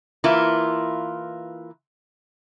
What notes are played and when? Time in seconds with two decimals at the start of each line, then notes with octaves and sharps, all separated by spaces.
0.24 E3 A#3 E4 F4